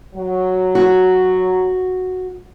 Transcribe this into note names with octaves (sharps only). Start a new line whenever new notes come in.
F#3
F#4